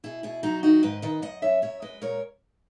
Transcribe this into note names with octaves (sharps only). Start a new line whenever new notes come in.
B2 E4 G#4
B2 E4 G#4
F#3 D#4 F#4
D#3 D#4 F#4
G#2 B4 D#5
D#3 B4 D#5
F#2 D#5 F#5
F#2 C#5 E5
F#2 C#5 E5
G#3 B4 D#5
A#2 A#4 C#5